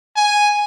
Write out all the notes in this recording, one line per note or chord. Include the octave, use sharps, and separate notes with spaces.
G#5